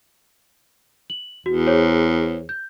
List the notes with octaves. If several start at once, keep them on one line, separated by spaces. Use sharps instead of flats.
F#7
E2 F#4
G#4 C5 C#5
G6